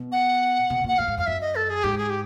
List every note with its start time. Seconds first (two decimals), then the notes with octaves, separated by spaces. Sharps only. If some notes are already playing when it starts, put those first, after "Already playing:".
Already playing: B2
0.12 F#5
0.70 B2
0.84 A#2 F#5
0.98 A2 F5
1.08 G#2
1.17 F2 F5
1.26 F#2 E5
1.41 D#5
1.56 A4
1.70 G#4
1.84 G#2 G4
1.98 G#4
2.10 G4